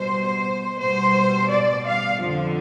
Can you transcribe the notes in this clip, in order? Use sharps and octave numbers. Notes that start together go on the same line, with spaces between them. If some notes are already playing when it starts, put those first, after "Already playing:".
Already playing: B2 G3 C5
B2 G3 C5
D5
F5
F2 D3 F3